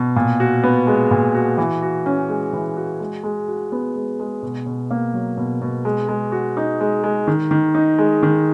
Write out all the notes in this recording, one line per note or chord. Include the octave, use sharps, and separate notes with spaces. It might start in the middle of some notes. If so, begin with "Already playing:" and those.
Already playing: B2
A#2
F#4
B3
G#3
A#2
F#4
E3
F#4
C#4
G#3
E3
F#4
G#3
G#3
F#4
B3
G#3
G#3
B2
B2
A#3
F#3
B2
B2
G#3
G#3
F#4
D#4
G#3
G#3
D#3
D#3
D#4
G#3
D#3